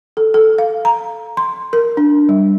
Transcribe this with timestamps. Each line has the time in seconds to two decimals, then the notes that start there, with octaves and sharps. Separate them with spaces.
0.17 A4
0.34 A4
0.58 F5
0.85 A#5
1.37 C6
1.73 A#4
1.97 D4
2.29 G3